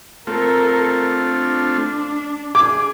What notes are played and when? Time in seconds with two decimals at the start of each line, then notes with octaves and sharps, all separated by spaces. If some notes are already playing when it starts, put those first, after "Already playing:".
0.27 A3 C4 F4 A4 A#4
1.08 D4
2.55 G#4 D6